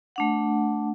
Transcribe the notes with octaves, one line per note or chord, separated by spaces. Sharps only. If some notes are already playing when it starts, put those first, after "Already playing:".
A3 D4 F#5